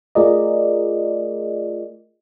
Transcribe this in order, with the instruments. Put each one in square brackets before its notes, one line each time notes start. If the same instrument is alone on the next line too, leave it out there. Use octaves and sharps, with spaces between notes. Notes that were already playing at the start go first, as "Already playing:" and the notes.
[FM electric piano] A3 F4 G#4 A#4 D5 D#5